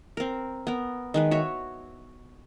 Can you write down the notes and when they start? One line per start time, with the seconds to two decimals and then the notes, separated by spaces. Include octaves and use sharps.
0.17 C4 A#4
0.67 B3 A#4
1.14 D#3 G#3 B4
1.31 F#4 C#5 E5